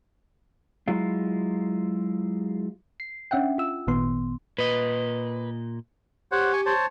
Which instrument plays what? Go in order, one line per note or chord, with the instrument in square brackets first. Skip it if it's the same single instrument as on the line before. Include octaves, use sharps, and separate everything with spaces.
[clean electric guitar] F#3 G#3 E4 F4
[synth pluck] C7
C#4 D4 E5 F#5 G5
F4 E6
G#1 A#2 D#3 B3 C6
[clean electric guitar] A#2 D#5 [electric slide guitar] B4
[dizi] G4 [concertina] C5 C#5 F#5
[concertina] G#5 C#6
C5 C#5 A5